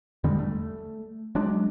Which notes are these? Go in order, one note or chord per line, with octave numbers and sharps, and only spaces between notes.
E2 D3 G3 G#3
A3
F#3 G#3 D4